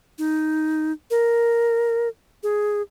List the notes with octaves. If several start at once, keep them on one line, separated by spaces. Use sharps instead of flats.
D#4
A#4
G#4